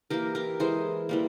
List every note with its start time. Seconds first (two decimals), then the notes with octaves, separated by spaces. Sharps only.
0.10 E3 A#3 G4 A#4
0.35 G4 A#4
0.60 E3 G#3 G#4 C5
1.09 E3 G3 A#3